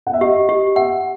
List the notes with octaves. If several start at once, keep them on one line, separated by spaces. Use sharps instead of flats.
F#5
E5
G4 D#5
G4
E5 F#5